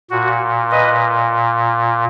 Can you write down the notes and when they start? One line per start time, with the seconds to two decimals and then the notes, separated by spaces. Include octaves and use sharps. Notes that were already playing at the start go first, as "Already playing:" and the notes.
0.11 A#2 F#4
0.71 B4 D#5